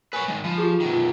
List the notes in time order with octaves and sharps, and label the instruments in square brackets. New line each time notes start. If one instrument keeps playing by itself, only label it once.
[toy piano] A#4 G#5 [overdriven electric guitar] B4 C#5
[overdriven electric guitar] D#3 G#3
[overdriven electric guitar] F3 [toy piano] B5
[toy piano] F4 G4 G#4
[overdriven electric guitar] B2 D#3
[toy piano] F4